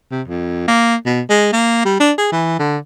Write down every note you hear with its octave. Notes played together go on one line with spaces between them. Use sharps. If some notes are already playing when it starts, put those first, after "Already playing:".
C3
F2
A#3
B2
G#3
A#3
G3
D4
G#4
E3
D3